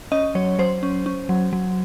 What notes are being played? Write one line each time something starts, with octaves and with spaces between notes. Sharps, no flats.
C#4 D#5
F#3 C#5
F#3 C5
C#4
C#4
F#3
F#3